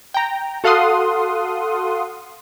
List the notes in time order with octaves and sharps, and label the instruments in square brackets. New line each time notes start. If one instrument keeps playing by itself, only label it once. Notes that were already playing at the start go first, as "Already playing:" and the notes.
[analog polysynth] G5 A#5
F#4 A4 F5 F#5 C6 D#6